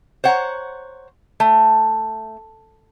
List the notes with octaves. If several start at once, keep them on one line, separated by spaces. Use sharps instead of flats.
C5 C#5 F#5 A#5
A3